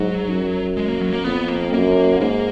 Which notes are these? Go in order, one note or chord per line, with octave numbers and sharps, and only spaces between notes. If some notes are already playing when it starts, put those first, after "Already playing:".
Already playing: G#2 F#3
F#2
G#3
A#3
F#3
A#3
F2 B3
A#3
F#2 A#3
G#2 A#3